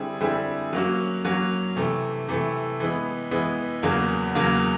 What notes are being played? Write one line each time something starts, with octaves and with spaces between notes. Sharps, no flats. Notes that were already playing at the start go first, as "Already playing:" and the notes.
Already playing: D3 G3 C4 E4 G#4
D3 G3 C4 E4 G#4
F#3 A#3 C#4 F#4
F#3 A#3 C#4 F#4
C3 E3 A3
C3 E3 A3
E3 G#3 B3
E3 G#3 B3
E2 C#3 F#3 A#3
E2 C#3 F#3 A#3